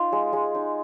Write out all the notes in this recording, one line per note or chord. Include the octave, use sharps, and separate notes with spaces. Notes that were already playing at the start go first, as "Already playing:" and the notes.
Already playing: D#4 F4
G#3
G#3
D#4